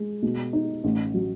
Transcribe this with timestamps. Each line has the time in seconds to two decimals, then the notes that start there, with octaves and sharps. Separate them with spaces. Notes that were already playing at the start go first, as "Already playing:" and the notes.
Already playing: G#3
0.23 B2
0.53 D#4
0.84 A1
1.14 F#3